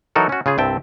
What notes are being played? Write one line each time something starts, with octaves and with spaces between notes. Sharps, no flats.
E3 F#3 D#4 F#4 A4 A#4
C#4 F#4
C#3 F4 G#4
C2 G2 C4 E5 G5 A5